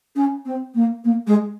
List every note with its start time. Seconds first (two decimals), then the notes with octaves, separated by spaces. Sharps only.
0.16 C#4
0.45 C4
0.74 A#3
1.04 A#3
1.27 G#3